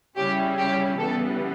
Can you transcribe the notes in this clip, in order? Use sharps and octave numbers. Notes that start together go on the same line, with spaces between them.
C#3 G3 C#4 E4 G4
G4
C#3 E3 G3 B3 A4